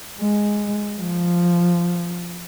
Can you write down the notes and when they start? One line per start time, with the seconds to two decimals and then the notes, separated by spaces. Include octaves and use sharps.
0.20 G#3
1.00 F3